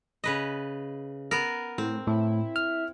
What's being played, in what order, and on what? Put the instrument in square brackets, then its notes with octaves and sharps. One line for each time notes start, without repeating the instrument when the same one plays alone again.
[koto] C#3 B4 D#5
B3 A#4
[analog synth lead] A2 [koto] C4
[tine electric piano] A2 [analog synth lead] E4
[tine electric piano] F6